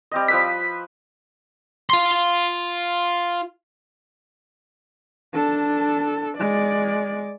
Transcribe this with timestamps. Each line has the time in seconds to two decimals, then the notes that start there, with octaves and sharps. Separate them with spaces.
0.11 G3 C4 D#5
0.28 F3 B4 E6 B6
1.90 F4 C6
5.33 D4 A4
6.37 G#3 D5